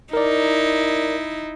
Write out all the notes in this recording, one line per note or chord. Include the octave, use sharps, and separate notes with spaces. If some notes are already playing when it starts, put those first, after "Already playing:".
D#4 E4 A#4 D5